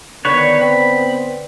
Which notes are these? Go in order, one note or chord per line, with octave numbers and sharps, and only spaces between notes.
D3 D#3 B3 B4 C#5
C4 B5